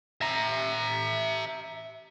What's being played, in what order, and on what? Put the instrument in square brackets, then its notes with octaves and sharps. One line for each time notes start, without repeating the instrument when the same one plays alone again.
[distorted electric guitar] E5 A#5